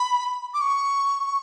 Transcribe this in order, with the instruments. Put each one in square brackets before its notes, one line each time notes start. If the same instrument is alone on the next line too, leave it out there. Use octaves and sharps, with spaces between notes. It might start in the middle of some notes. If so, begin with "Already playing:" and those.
Already playing: [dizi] B5
D6
C#6